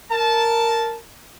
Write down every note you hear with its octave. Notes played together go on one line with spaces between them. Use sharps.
A#4 A5